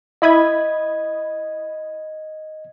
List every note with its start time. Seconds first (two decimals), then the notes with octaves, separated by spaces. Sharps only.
0.22 E4 D#5 B5 D#6 G#6